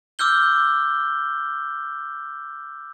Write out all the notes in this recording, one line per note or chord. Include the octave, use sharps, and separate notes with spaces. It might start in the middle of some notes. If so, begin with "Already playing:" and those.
D6 E6 F6 G6 G7